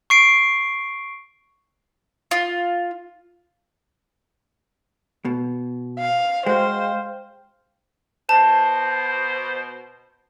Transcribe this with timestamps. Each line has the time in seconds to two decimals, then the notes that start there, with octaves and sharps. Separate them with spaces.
0.10 C#6 C7 D7
2.31 F4
5.25 B2
5.99 F5
6.46 G#3 F#4 C5 F5 G5
8.29 B2 C5 A5